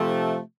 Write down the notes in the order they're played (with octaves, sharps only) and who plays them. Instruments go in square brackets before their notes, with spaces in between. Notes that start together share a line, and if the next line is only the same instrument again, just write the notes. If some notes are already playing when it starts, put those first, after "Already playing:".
Already playing: [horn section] C3 F3 A3